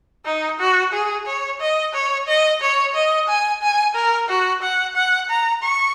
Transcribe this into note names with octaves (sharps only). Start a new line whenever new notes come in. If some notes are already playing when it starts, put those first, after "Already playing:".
D#4
F#4
G#4
C#5
D#5
C#5
D#5
C#5
D#5
G#5
G#5
A#4
F#4
F#5
F#5
A#5
C#6